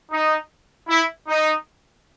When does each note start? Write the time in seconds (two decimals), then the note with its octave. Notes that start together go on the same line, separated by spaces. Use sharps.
0.11 D#4
0.88 E4
1.28 D#4